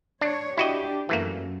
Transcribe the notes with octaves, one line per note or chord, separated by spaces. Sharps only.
D4 C#5
D4 E4 F#4 G4 D#5
F#2 E3 A3 A#3